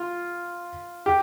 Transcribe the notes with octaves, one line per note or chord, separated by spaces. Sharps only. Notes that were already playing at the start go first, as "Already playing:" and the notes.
Already playing: F4
G4